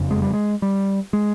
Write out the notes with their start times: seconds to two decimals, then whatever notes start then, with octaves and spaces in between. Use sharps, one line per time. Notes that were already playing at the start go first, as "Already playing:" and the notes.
Already playing: F#1 F2 C#3
0.11 G#3
0.22 G3
0.33 G#3
0.62 G3
1.13 G#3